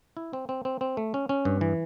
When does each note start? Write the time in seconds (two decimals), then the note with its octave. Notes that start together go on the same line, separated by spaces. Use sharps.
0.17 E4
0.33 C4
0.49 C4
0.65 C4
0.81 C4
0.97 A3
1.14 C#4
1.29 C#4
1.45 G2
1.61 E3